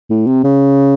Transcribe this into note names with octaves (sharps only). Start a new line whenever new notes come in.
A2
C3
C#3